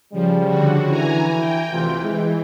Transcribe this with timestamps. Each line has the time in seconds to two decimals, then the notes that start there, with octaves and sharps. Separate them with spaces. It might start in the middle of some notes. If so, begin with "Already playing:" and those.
0.13 C#3 F3 G3
0.47 D3 F#4
0.90 E3 G#5 A#5
1.39 G5
1.72 D2 C3 E3 F4
2.03 G#3